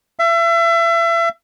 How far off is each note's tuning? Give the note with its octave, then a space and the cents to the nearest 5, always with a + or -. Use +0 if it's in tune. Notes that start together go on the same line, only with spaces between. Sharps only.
E5 +35